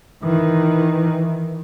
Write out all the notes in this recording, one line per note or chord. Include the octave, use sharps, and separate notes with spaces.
D#3 E3